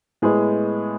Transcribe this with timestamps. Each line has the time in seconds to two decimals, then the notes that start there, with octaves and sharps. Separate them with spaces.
0.22 A2 G#3 B3 G#4